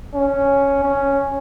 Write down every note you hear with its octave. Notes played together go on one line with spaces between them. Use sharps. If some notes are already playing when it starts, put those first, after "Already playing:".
C#4
C#4